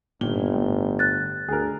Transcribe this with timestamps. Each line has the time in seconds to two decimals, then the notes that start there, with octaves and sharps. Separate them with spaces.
0.21 G1 A#2 D#3 G7
0.54 A2
0.99 F#6 A6
1.48 D2 G#4 A#4